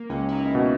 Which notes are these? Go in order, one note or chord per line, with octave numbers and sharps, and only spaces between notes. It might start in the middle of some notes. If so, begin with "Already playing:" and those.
Already playing: A#3
C#2 C#4
E4
D#4
B2